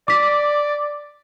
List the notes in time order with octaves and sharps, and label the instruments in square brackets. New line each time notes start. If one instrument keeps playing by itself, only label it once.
[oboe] D5 [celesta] D6 B6